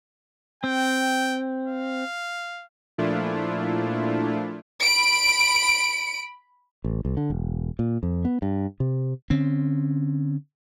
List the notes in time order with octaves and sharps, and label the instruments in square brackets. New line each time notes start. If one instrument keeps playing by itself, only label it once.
[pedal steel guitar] C4 [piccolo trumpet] G5
[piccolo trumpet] F5
[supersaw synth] A#2 F3 A3 D4 E4 F4
[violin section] B5 D7
[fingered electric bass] A1
C2
D3
E1
A#2
F2
B3
G2
C3
[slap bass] D3 C4 C#4